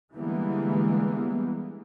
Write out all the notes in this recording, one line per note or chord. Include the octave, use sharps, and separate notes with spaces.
D3 E3 G3 G#3 A#3 B3